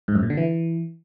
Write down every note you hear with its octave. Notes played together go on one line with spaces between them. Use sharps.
G#2
F#2
A#2
D3
E3